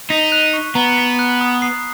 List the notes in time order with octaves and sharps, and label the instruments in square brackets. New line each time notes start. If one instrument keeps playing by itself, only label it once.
[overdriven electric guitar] D#4 [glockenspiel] B6
[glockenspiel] F#6
C#6
[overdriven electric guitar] B3 [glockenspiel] A#5
[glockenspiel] B6
F#6
D#6
C7